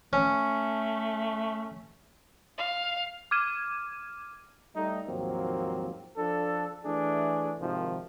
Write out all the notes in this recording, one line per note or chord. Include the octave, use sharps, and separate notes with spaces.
A3 C#4
F5
D6 F6 G#6 D#7 E7
G3 A3 D#4
D#2 G#2 F3 F#3 A#3 C4
F3 D4 A4
E3 A3 D4 G#4
G#1 C3 D#3 F3